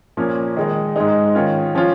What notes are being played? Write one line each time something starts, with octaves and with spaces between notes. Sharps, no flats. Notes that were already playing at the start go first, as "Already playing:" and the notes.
A#2 F3 A#3 C#4
D#3 G#3 D#4
G#2 G#3 D#4
D#3 C#4 F4
F3 C#4 F4